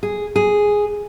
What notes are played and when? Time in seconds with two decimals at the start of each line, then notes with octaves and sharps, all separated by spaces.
0.03 G#4
0.36 G#4